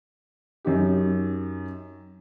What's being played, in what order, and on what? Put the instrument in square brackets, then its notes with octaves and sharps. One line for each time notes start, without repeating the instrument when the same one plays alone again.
[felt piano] F#2 D#4 G4